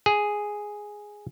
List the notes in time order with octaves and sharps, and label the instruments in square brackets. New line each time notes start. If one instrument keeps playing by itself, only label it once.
[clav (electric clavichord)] G#4